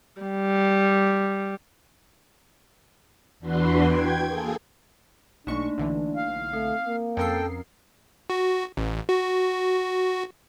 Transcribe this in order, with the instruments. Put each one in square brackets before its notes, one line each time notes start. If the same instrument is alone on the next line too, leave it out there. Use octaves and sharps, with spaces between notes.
[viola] G3
[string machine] E2 E3 D4 F#4 B4 C6
G5 G#6
A#3 G#4 A4
[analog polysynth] B1 C#6 [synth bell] A3 A#3 D#4 [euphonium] D4
[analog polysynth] B1 D3 E3
[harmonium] F5
[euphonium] A3 [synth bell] C4
[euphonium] A#3
[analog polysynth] F2 A#4 C7 [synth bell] C4 C#4 [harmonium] A4 G5
[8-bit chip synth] F#4
A1
F#4